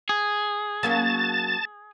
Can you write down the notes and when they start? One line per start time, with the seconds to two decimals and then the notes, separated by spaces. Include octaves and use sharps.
0.09 G#4
0.83 F#3 A#3 C#4 A5 A6